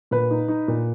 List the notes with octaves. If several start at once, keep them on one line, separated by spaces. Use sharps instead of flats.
A#2 B4
D#4
D#4
A#2